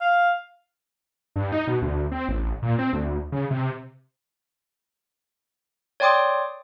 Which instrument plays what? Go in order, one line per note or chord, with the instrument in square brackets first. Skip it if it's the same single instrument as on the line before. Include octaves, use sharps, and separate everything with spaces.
[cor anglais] F5
[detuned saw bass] G2
D#4
B2
D2
C4
A1
A#2
C4
D2
C#3
C3
[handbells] C#5 D5 G5 C6 D6 D#6